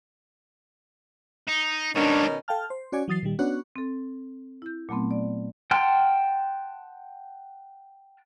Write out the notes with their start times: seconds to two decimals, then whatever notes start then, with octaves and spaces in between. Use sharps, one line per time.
1.49 D#4
1.96 G#2 B2 D#3 G3 C#4 D4 C#5
2.48 A4 F5 G5 A5 F6
2.70 C5
2.92 C#4 F#4 C#5 D5 G#5
3.08 E3 F#3 D#6 A6 C7
3.23 A#2 D#3 G3
3.39 B3 C#4 D4 F#4 C#5 F#6
3.76 C4 A4
4.62 E4 G6
4.89 A#2 F#3 A3 B3 C4
5.11 D5
5.71 F#5 G5 A5 C6 F6